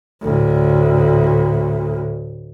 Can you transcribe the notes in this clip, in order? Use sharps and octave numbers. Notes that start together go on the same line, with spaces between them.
D2 A2